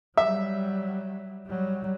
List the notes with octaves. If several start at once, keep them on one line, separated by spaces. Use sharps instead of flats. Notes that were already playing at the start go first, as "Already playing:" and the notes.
F#3 G3 E5
F#3 G3